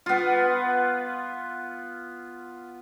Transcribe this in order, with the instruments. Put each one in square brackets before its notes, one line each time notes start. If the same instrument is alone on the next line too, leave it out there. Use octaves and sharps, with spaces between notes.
[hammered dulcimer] B3 F4